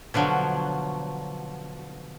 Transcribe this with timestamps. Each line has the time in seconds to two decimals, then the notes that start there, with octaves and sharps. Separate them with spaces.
0.14 B2 D3 F3 F#3